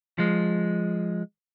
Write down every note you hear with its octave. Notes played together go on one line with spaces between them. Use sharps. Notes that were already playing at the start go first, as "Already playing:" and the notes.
F3 G#3